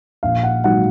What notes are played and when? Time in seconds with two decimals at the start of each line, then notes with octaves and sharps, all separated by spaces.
0.23 A#1 F5
0.43 F#5
0.64 G#2 D#3 F#3 A#3 F#5